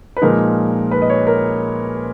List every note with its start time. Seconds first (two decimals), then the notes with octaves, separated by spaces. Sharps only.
0.17 B4
0.22 A#2 F3 G#3 D#4 A#4
0.91 B4
1.02 D#5
1.10 C#5
1.27 A#4